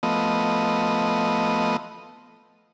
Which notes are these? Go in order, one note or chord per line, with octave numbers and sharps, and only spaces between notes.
F3 A3 B3 D#5